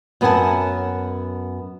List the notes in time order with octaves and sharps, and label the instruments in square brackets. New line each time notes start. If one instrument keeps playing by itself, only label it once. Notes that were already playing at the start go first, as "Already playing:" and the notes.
[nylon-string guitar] F#2 B3 A#4 F#5 G#5 A5